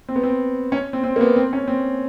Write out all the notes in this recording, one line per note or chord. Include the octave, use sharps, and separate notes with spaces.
C4
B3
C4
C#4
C4
C4
A#3
B3
C4
C#4
C4